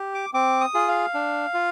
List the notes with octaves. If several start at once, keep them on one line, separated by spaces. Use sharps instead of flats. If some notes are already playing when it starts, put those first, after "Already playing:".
Already playing: G4
D6
C4 D6
D#6
F4 G#4
F5
D4
F4